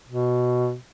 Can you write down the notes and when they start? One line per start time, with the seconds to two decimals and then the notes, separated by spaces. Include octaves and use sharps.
0.09 B2